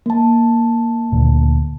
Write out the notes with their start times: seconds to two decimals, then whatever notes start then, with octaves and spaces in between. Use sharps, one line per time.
0.06 A#3 A5
1.12 D2 A#2